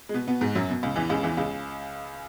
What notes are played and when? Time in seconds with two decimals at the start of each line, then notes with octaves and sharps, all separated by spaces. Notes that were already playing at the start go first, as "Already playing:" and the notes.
0.09 G#3
0.14 B2 B3
0.27 B2 B3
0.41 G#2 G#3
0.55 F#2 F#3
0.69 B2
0.83 C#2 C#3
0.96 E2 E3
1.09 C#2 C#3
1.23 E2 E3
1.37 C#2 C#3